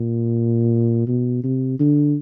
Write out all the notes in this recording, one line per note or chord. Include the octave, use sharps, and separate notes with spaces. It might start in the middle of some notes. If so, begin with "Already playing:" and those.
Already playing: A#2
B2
C3
D3